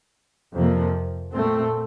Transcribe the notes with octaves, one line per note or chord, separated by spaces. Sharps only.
F2 C3 F3 A#3
A#2 A3 C4